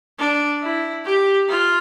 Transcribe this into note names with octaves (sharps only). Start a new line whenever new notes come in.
D4
E4
G4
F4